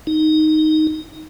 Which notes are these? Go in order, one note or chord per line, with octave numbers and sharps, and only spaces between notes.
D#4